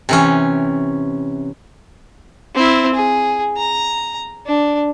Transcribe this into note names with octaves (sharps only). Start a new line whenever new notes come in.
C3 E3 C#4
C4 E4
G#4
A#5
D4